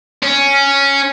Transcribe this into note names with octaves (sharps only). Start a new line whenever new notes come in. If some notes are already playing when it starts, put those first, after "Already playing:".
C#4